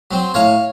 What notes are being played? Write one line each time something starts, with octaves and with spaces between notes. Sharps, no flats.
F#3 C4
A2 C#5 F5